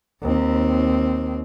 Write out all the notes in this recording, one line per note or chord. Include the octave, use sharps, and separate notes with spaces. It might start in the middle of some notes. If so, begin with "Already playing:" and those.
D#2 C4